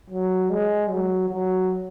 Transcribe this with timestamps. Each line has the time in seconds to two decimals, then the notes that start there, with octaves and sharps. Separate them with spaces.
0.10 F#3
0.50 G#3
0.89 F#3
1.29 F#3